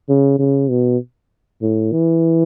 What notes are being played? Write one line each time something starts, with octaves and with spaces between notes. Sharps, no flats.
C#3
C#3
B2
A2
E3